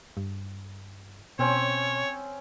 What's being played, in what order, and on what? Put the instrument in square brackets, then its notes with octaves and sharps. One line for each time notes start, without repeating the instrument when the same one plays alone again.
[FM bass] G2
[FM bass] B2 [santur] C4 C#4 [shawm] C#5